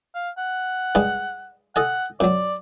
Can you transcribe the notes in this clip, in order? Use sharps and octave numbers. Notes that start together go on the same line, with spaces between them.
F5
F#5
G2 G3 G#3
A4 D#5 F#5 G#5
F#2 F#3 D5